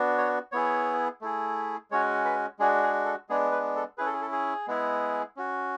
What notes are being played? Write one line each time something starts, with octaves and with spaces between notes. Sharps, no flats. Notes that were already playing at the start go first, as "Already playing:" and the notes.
Already playing: B3 D4 F#4
C#5
B3 E4 G#4 C#5
A3 E4 G#4
G#3 C#4 F#4 C#5
B4
G#3 D4 F#4 G#4
G#4
A4
G#3 B3 D4 G#4
B4
A4
C#4 E4 G#4 B4
A4
G#4
A4
G#4
G#3 B3 E4 G#4
C#4 F#4